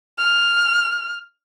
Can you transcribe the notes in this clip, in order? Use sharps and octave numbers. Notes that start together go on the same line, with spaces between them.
F6